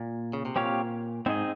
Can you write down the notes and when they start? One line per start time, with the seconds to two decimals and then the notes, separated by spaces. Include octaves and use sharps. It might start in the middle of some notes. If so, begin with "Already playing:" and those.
Already playing: A#2
0.33 C#3
0.45 C3
0.56 A#2 C4 G4 C#5 F5
1.26 G#2 C4 D#4 G#4 D#5